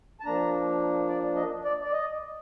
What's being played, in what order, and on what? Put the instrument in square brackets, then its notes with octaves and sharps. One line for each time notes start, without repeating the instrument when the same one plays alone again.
[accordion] A5
F3 A#3 D4 A#5
D5
D#5
D5
D5
D#5